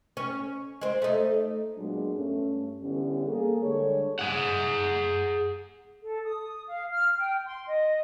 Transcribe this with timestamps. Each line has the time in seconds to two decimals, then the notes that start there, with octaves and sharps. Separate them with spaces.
0.17 C#4
0.81 G#3 C4
1.02 A3 D#4
1.78 A#2 F#3 G#3 B3 D4
2.16 G2 A3 C#4
2.82 D3 E3 G3 B3 C#4
3.28 A#3 G#4 A4
3.61 D3 G3 G#3 D4 A4 C#5
4.19 G#4 F#5
6.02 A4
6.24 D#6
6.67 F5
6.91 F6
7.18 G5
7.46 C6
7.67 D#5